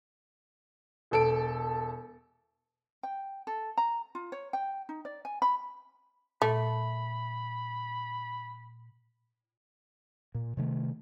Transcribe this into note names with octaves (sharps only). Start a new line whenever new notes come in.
E1 A4 D7
G5
A4
A#5
F4
C#5
G5
D#4
D5
G#5
B5
A#2 A3 B5
A#2
C3 D#3 G3 A3